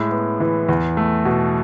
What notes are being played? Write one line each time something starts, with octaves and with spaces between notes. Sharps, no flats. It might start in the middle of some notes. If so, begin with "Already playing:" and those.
Already playing: A2 G#3
B3
E3
E2
A3
B2